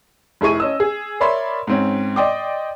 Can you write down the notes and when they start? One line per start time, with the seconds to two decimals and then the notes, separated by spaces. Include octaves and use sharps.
0.41 F1 E4 G#4 C#6 D#7
0.60 C#4 D#5 E6
0.80 G#4
1.20 A#4 C#5 D5 E5 B5 C6
1.67 G#2 C4 C#4
2.16 D5 D#5 G5 C6 D6